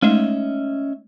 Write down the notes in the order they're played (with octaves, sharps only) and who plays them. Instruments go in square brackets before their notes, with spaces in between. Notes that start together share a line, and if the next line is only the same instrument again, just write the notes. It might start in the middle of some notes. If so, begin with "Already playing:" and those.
[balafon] G#3 A3 D#4 [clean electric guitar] C#4 D#5 E5